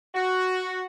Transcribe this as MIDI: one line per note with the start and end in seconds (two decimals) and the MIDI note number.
0.14 0.82 66